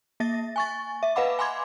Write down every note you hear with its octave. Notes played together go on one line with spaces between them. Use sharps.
A#3 E5 A6 A#6
G#5 C#6 A6
E5
B4 D#5 F5 F#5 B5 D6
G#5 B5 C6 D6 G#6